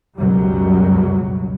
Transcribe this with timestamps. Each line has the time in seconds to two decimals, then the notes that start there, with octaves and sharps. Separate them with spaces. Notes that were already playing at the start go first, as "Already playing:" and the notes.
0.18 C#2 F#2 B2 F#3 G3